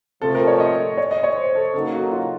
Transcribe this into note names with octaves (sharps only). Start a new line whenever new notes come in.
C3 F3 A3 C4 F4 A4
A#4
C#5
D#5
C#5
D#5
C#5
C5
A4
C#3 F#3 A#3 D#4 A4
F#4
F4